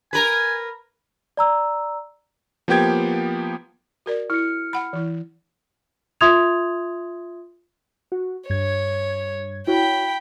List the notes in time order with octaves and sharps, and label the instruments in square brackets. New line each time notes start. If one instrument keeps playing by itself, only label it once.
[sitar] A#4 B4 [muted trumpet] G#5
[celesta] D5 A#5 E6
[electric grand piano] F3 A#3 B3 G4 G5 G#6
[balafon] F#4 A#4 D5
[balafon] E4 [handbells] F6 C#7
[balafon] F#5 B5
E3 E4
[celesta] F4 E5 C6 D#6 G#6 F7
[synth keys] F#4
[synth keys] G2 G#6 [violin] C#5
[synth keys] E4 F#4 C#5 [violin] G5 B5